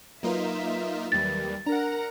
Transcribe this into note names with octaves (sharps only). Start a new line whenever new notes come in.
F#3 A#3 D#4 F4 A#4 B4 E5
D#2 G3 A6
D4 A#4 F#5 A#5